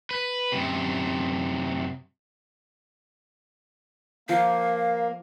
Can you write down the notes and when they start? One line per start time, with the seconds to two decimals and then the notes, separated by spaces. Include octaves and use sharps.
0.11 B4
0.52 F#2 C3
4.29 F3 A#3 F5